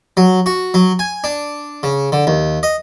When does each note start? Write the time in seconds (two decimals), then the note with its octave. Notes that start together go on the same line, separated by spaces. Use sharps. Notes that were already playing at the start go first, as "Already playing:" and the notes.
0.17 F#3
0.46 F#4
0.74 F#3
0.99 G#5
1.24 D4
1.83 C#3
2.12 D3
2.27 D#2
2.63 D#5